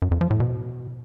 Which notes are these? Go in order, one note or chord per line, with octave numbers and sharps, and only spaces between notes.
F#2
F2
F3
A2
B2